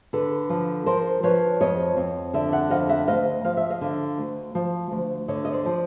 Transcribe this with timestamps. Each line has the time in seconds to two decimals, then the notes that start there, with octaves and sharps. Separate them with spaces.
0.13 D3 A4 B4
0.50 F3
0.86 F3 A#4 C5
1.23 F3 B4 C#5
1.60 F2 C#5 D#5
1.97 F2
2.34 D3 D5 E5
2.52 E5 F#5
2.70 F2 D#5 F5
2.89 E5 F#5
3.07 D2 D#5 F5
3.45 F3 F5
3.57 E5
3.70 D#5 F5
3.81 D3
4.18 D2
4.55 F3
4.91 D2
5.28 D3 C#5 D#5
5.45 D#5
5.53 C5 D5
5.66 F3